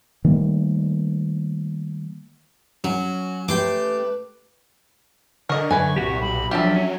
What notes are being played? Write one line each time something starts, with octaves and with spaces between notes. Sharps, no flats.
D#3 G3 A3 A#3
F#3 C#4 F#4
A3 G4 B4 G5 C6 D6
D3 A#4 D#5 C#6
F#2 B4 G#5
C2 A#2 F#4 G4
B1 B5
F3 F#3 D4 F4 G4 A4 E5
C#4